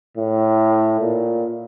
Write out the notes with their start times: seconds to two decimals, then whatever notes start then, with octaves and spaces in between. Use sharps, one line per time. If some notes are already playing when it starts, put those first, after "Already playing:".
0.17 A2
1.00 A#2